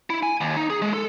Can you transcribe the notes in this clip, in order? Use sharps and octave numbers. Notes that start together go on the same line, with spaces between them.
E4
G#5
D#2
D#4
G#4
G#3
A4